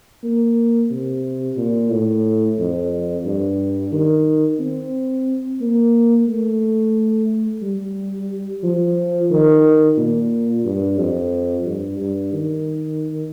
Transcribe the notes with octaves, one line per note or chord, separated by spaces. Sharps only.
A#3
C3
A#2
A2
F2
G2
D#3
C4
A#3
A3
G3
F3
D#3
A#2
G2
F2
G2
G2
D#3